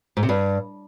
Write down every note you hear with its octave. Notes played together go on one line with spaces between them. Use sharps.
G#2
C3
G2